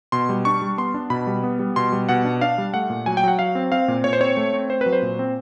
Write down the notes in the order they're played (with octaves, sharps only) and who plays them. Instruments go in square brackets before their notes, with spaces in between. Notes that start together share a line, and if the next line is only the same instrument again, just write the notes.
[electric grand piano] B2 C6
G3
D4 C#6
G3
B3 C6
D4
B2 B5
G3
B3
G3
B2 C6
G3
B2 F#5
D4
D4 F5
G3
A3 F#5
A#2
F#3 G#5
G5
F#3 F#5
F#3 F5
C4
C4 F5
A#2
A#2 C#5
C5
C4 C#5
A3
C4
C4 C5
F#3 B4
C5
A#2
C4